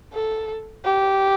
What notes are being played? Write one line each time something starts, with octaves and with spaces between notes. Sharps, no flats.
A4
G4